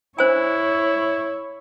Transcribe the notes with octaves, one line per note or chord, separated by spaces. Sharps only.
D4 E4 C5 C#5 G#5